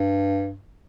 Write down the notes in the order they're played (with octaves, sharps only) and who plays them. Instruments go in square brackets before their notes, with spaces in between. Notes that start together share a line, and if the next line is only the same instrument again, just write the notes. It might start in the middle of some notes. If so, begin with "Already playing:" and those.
Already playing: [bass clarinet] G2